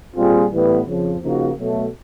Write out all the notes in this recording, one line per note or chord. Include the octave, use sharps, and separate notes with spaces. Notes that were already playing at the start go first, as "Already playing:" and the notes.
A#2 G3 C4 F4 G#4
A2 E3 G3 B3
F2 C#3 F3
C#3 F3 A#3 D#4 F#4
B2 F#3 A3